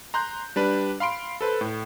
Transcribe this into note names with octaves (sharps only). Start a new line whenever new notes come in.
A#5 C6 F#6 G6
G3 D4 B4
F5 B5 C6 D7
A4 B4 C5
A2